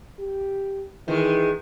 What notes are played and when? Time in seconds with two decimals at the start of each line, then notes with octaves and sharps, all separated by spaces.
0.19 G4
1.08 D#3 E3 G#3